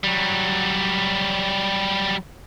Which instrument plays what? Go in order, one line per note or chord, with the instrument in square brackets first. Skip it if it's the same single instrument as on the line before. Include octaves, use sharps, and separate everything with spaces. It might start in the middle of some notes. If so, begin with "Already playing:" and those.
[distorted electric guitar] F#3 G3